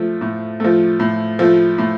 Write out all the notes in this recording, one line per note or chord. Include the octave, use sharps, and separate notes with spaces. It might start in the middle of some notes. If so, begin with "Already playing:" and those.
Already playing: F3 A3
A2
F3 A3
A2
F3 A3
A2